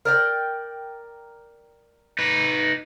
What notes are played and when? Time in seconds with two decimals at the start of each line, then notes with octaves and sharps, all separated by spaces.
0.05 A#4 D5 G5
2.19 D#4 B4